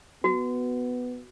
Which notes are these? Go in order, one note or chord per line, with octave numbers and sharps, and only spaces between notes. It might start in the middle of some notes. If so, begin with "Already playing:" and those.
B3 F#4